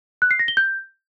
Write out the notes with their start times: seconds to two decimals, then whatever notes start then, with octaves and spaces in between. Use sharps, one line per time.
0.22 F#6
0.31 C7
0.39 A#6
0.48 G7
0.57 G6